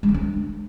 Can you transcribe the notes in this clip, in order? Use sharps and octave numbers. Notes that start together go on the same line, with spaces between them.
G#3
D3
D4